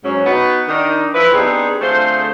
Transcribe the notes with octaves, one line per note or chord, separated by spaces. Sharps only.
G#2 F#3 C#4
B3 D#4 F#4
D#3 D4 D#4
F3 E4 B4
B3 C4 D4 D#4 G4 G#4
D3 A3 C4 F4 G#4 C5